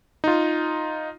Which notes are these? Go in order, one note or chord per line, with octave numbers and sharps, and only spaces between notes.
D#4 F4